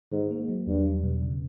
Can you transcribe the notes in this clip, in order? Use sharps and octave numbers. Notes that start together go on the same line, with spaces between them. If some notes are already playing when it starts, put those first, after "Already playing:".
G#2 D#3
A#3
F#3
E2 G2
G3
B2
C#3